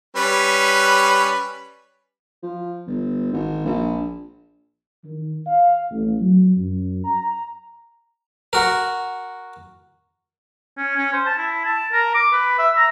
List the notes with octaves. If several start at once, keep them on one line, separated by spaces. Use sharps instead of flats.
G3 C#4 B4
F3
G1
G#1
A#1
D#3
F5
A1
F#3
F#2
A#5
F#4 A#4
C#4
C#4
C5
A5
E4
A5
A#4
D6
B4
E5
A#5